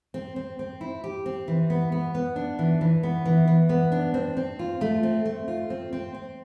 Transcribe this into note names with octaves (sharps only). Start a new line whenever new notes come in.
C4
C4
C4
E4
G4
C4
E3
B3
B3
B3
D4
E3
E3
B3
E3
E3
B3
D4
C4
C4
F4
A3
C4
A3
F4
C4
C4
C4